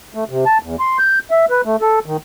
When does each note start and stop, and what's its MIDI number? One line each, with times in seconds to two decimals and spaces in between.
0.14 0.24 57
0.30 0.45 48
0.46 0.58 81
0.62 0.76 40
0.80 0.98 84
0.99 1.19 91
1.31 1.45 76
1.50 1.61 71
1.65 1.76 57
1.81 1.99 69
2.06 2.17 51